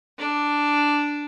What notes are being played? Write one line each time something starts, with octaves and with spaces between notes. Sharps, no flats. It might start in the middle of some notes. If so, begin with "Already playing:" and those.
D4